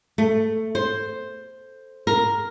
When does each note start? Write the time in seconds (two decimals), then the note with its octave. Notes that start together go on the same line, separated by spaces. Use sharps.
0.18 A3
0.75 C5
2.07 A#4